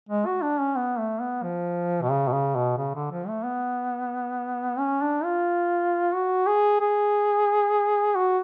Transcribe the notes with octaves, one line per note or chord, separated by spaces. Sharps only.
G#3
F#4
D4
C#4
B3
A3
B3
F3
B2
C#3
B2
C#3
B2
C#3
D3
F3
A3
B3
C#4
D4
F4
F#4
G#4
G#4
F#4